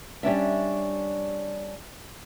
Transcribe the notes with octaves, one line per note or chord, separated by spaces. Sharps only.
G3 C#4 D4 E5